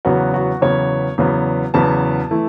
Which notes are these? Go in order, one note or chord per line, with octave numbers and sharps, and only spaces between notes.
E2 C#3 F#3 B3 F#4
F#4
E2 C#3 F#3 B3 C#5
E2 C#3 F#3 B3
E2 C#3 F#3 B3 A5
E3 A3 E4